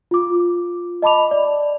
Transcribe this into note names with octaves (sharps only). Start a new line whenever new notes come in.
F4 D6
D#5 A5 B5 D6 F7
D5